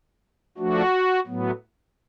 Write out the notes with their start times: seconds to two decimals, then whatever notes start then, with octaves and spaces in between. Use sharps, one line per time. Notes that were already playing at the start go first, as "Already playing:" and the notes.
0.58 F3 A3 D4 F#4
1.27 A2 F#3 B3